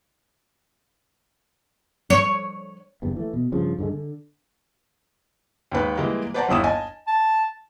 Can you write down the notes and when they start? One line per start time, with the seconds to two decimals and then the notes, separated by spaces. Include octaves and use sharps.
2.10 C#5
3.02 F#1 E2 G2
3.16 E3 A3
3.33 B2
3.52 G2 C#3 F3
3.78 G2 D3 F3 G#3
3.93 D3
5.72 D#2 G#2 B4
5.97 E3 G3 G#3 A#3
6.34 B4 C5 D5 F#5 A5 A#5
6.48 G1 D#2 E4 D#6 E7
6.64 D#5 G#5 A5
7.07 A5